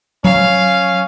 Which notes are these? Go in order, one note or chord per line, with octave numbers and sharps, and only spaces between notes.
F#3 C#4 F5